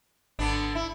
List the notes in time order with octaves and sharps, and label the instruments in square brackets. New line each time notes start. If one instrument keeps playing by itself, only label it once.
[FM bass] G#1 [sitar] D3 B3 D4
[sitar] E4